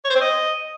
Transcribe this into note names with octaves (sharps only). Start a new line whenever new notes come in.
C#5
C5
C4
D#5